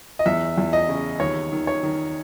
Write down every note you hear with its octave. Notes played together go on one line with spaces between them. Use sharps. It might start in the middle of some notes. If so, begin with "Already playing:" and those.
D#5
E2 E5
E2
D#5
C#3
D#2 C#5
D#3
C#5
D#3